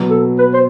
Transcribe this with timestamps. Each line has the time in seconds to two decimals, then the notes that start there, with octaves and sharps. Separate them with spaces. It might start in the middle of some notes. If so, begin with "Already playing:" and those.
Already playing: B2 F#3 B3
0.10 A4
0.38 B4
0.53 C5